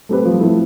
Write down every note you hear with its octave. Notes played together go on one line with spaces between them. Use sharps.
A3 C4 G4 B4
F3
A3 C4 E4